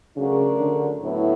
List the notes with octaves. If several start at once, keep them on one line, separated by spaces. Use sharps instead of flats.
C#3 F#3 A3 D4 F#4 A#4
D3
A2 F#3 B3 E4 A4 C#5